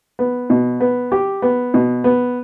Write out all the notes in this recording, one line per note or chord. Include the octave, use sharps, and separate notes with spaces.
B3
B2
B3
G4
B3
B2
B3